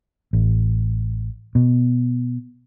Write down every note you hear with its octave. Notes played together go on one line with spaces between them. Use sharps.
A1
B2